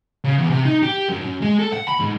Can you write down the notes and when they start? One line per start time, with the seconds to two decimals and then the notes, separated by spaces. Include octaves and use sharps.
0.25 C#3
0.38 E2
0.49 C3
0.65 D#4
0.83 G4
1.09 F#2
1.21 F#2
1.42 G#3
1.59 A4
1.74 F#5
1.89 B5
2.01 G#2